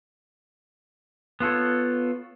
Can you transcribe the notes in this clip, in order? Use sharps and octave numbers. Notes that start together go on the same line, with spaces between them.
B3 F4 A4 C#5